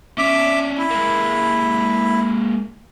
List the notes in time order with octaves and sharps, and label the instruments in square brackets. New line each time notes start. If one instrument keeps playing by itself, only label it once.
[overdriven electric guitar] C#4 D4 [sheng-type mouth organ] E5 D6
[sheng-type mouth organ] E4
[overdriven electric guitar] G#3 A#3